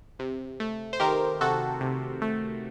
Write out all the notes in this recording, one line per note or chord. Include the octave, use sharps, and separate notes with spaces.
C3
A3
C5
D#3 G4 A#4
C3 F#4 A4
C3
A3